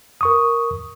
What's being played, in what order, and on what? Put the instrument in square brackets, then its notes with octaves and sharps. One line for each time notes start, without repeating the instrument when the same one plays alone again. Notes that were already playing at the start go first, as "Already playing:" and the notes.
[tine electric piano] A#4 C#6 D#6